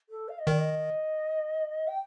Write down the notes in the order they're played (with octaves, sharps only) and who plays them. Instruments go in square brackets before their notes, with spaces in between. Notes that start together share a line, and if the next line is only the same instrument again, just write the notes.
[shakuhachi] A4
F5
D#5
[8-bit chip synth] D#3 [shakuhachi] D5
[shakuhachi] D#5
G5